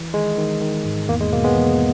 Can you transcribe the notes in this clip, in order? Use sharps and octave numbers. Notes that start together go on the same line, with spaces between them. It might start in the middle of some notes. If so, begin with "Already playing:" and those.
Already playing: E3
D#3 G#3
D#3
D#3
G#2
E2 A#3
G#3
B2 A#3
G#3 B3
E2